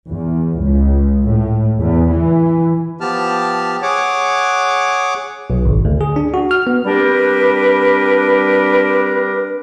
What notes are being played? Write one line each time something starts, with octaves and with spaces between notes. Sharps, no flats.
E2
C#2
A2
E2
E3
F3 B3 G4 A5 F6
G#4 C#5 F#5 D6
B1
G#1
D2
G#4
D4
F#4
F6
B3
G3 C4 D4 G4 A#4 B4